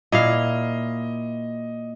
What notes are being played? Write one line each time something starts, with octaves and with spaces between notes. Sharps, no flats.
A#2 E4 D#5 F5